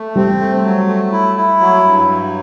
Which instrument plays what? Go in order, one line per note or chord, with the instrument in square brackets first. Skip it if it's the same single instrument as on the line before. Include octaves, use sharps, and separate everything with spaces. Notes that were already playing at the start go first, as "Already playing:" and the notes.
Already playing: [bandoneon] A3
[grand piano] G3 [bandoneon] C4
[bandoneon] A3
F#3
A3
E4
E4
F#3
G2
F#3